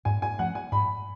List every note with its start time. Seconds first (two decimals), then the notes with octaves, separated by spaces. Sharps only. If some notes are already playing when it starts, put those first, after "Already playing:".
0.05 G#2 G#5
0.22 G#5
0.39 F3 A3 C#4 F#5
0.55 G#5
0.72 G#2 B5